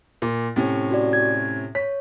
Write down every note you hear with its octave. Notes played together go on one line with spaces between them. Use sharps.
A#2
A2 C3 C#4
F#4 D5
G#6
C#5 B6